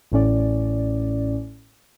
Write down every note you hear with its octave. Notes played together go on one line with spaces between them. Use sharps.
A1 A2 C#4 D5